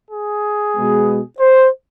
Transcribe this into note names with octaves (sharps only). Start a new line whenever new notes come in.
G#4
B2 G#3 B3
C5